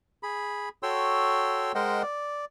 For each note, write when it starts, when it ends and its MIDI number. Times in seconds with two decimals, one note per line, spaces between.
0.23 0.69 68
0.23 0.69 83
0.83 1.72 66
0.83 1.72 69
0.83 1.72 73
0.83 1.72 79
0.83 1.72 84
0.83 1.72 88
1.75 2.02 56
1.75 2.02 70
1.75 2.02 72
1.75 2.02 75
1.75 2.02 78
1.75 2.02 79
2.03 2.45 74